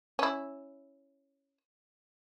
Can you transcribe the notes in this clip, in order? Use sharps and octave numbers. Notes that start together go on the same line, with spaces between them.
C#4 E4